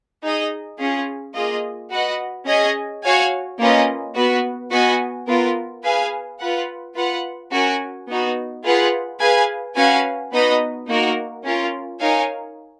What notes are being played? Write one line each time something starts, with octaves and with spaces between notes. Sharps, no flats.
D#4 G#4 D#5
C#4 F4 G#4
A#3 F4 G#4 D#5
F#4 B4 D#5 F#5
C#4 G#4 D#5 G#5
F#4 C#5 F5 G#5
A#3 C#4 F4 B4 D#5
B3 F#4 B4
B3 F#4 B4 D#5 G#5
B3 F4 A#4
G#4 B4 F5 G#5
F4 B4 F#5
F4 B4 F#5
C#4 F#4 A#4 C#5 G#5
B3 D#4 F#4
F4 G#4 B4 F#5
G#4 B4 F5 G#5
C#4 F#4 B4 F5 G#5
B3 D#4 F#4 B4 D#5
A#3 D#4 F#4 A#4
C#4 F4 A#4
D#4 A#4 C#5 F5 G#5